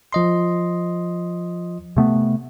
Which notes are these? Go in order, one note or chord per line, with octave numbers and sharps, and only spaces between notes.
F3 D#5 C6
C3 A3 B3